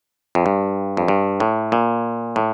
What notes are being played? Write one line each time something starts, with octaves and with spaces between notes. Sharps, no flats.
F2
G2
F2
G2
A2
A#2
A2